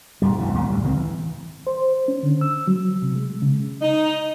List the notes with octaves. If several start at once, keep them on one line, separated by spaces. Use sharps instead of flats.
D#1 G#2 G3
G#1 F#2 B2 E3
D#2 G#2 B3
D2 A2 C3 G3
C#2 D#3 G3 C4
E3
C5
C#4
D3
E6
F#3
C3
G#3
C#3
D#4